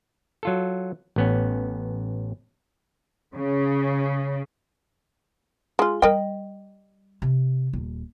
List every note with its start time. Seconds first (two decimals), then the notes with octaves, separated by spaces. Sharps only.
0.43 F#3 F4 A4
1.16 A1 B3 C#4
3.36 C#3
5.79 G#3 F4
6.02 G3 A#4 D#5 G5
7.22 C3
7.73 D#1